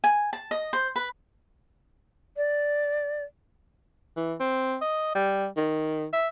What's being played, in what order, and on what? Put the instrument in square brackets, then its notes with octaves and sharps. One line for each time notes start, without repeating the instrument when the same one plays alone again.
[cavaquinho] G#5
A5
D#5
C5
B4
[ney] D5
[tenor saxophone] E3
C4
D#5
G3
D#3
E5